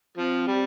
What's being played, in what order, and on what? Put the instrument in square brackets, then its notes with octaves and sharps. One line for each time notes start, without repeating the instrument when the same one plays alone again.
[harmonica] F3 [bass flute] C4
[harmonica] G3